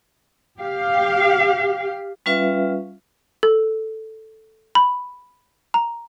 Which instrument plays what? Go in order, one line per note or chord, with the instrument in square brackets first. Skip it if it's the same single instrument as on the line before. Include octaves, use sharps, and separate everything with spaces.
[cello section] G4 F5
[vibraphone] G3 C#4 F4 B4 E5 F5
[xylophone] A4
B5
A#5